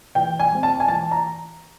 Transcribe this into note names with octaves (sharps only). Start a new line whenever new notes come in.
E3 G5
G#5
G#3 C4
A5
G#5
E3 A5
A#5